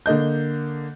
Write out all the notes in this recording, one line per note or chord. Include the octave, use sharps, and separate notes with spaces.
D3 A#3 D#5 G6